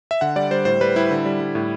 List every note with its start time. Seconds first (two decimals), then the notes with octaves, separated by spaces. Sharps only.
0.11 E5
0.21 D3 F#5
0.36 G3 D5
0.51 G3 C5
0.65 A2 C5
0.81 G3 B4
0.96 G3 E4
1.11 D3
1.26 G3
1.41 G3
1.55 A2